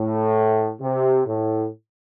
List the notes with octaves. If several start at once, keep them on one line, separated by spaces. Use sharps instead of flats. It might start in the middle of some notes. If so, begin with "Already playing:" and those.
Already playing: A2
C3
A2